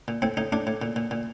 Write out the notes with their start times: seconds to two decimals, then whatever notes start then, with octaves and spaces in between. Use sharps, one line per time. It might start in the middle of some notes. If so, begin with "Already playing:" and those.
0.08 A#2
0.22 A2 C4
0.37 A2 D#4
0.52 A2 D4
0.67 A2
0.82 A#2
0.96 A#2
1.11 A#2